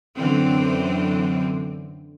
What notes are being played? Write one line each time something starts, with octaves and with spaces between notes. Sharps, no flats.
F#2 D3 E3 C4